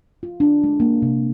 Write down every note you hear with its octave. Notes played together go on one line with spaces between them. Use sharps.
F4
D4
G#3
A#3
C3